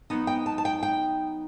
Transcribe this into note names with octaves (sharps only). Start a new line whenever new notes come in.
F#3 B3 D#4
G5
A5
A5
G5
G5